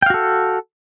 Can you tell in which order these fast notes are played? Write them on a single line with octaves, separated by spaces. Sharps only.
G5 F5 F#4 A4